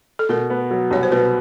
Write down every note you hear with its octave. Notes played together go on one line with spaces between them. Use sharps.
A4
B2 A#4
B3
F#3
C2 C#5
C5
B2 B4